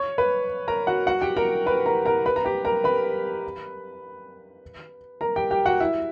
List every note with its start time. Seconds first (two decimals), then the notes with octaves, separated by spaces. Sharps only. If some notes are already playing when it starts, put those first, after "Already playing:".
Already playing: C#5 C#6
0.18 B4 B5
0.68 A#4 A#5
0.87 F#4 F#5
1.07 F#4 F#5
1.21 G4 G5
1.36 A#4 A#5
1.66 B4 B5
1.86 A#4 A#5
2.06 A#4 A#5
2.26 B4 B5
2.36 A#5
2.45 G4 G5
2.65 A#4 A#5
2.84 B4 B5
5.21 A#4 A#5
5.36 G4 G5
5.51 G4 G5
5.65 F#4 F#5
5.80 E4 E5